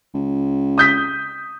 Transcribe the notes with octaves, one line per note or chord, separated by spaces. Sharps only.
C#2
D#6 G6 B6